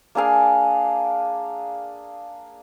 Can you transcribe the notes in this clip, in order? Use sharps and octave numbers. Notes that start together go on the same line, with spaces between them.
A#3 D4 G#4 F5